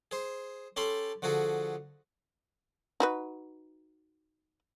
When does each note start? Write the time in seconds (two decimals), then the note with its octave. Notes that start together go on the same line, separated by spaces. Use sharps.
0.11 G#4 C5
0.76 C#4 G4 A4 A5 B5 C6
1.22 D3 F3 F#4 G#4 A4
3.00 D#4 F#4 B4